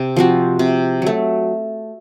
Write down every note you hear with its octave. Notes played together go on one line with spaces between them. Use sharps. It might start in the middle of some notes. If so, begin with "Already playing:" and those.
Already playing: C3
F3 C4 F#4
C3
F#3 A3